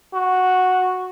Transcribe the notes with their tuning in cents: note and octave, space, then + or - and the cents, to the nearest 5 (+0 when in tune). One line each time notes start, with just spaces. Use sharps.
F#4 -5